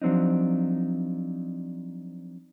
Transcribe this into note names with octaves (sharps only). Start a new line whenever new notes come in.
F3 F#3 C4 D4 D#4